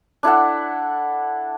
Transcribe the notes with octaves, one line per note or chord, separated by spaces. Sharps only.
D4 E4 A4 F#5